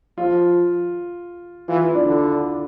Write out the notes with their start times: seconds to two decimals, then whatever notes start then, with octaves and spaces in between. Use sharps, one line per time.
0.18 F3 F4
1.68 E3 F4
1.82 E4
1.95 D4
2.05 D3 E4